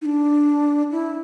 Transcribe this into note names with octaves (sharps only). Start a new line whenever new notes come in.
D#4
D4
E4